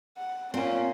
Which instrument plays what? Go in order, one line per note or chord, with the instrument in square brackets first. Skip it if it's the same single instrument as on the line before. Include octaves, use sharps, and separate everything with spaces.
[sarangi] F#5
[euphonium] A#2 [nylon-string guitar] C4 [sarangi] C#4